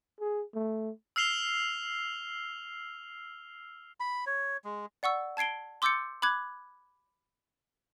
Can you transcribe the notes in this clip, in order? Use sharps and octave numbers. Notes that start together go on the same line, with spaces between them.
G#4
A3
E6 F6 C7 F7 G7
B5
C#5
G#3
D5 F#5 C#6 E6
A5 G#6 C7 D7 G7
C6 D6 E6 G6 A6 C#7
B5 D6 F#6 G#6